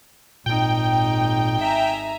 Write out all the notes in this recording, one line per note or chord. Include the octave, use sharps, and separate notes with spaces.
G#1 A#2 D#4 G5
E5 G#5 A#5